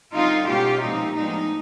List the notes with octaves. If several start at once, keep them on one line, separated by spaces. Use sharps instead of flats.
D3 G3 C4 D#4 F4
B2 G#3 C#4 F4 G4
A#2 F3 G#3 C4 D#4
A2 F3 G#3 B3 D4 D#4